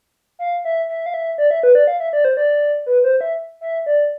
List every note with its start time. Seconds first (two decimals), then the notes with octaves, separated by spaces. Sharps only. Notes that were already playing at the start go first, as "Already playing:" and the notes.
0.39 F5
0.65 E5
0.89 E5
1.06 F5
1.14 E5
1.38 D5
1.51 E5
1.63 B4
1.75 D5
1.87 F5
2.00 E5
2.13 D5
2.25 C5
2.37 D5
2.86 B4
3.04 C5
3.21 E5
3.61 E5
3.86 D5